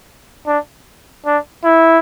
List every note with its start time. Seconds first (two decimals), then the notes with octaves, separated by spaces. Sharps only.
0.47 D4
1.26 D4
1.65 E4